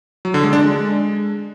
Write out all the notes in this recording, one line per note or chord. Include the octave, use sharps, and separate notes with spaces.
F#3
D3
G#3
D4
G#3